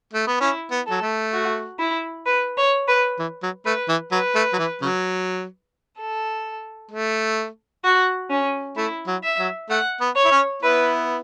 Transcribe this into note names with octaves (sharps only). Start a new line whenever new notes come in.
A3
B3
C#4 E4
B3
F#3 A4
A3
F#4
E4
B4
C#5
B4
E3
F#3
A3 B4
E3
F#3 B4
A3
F#3
E3
C#3 F#3
A4
A3
F#4
C#4
A3 E4
F#3
E5
F#3
A3 F#5
B3
C#5
E4
C#4
B3 E4 B4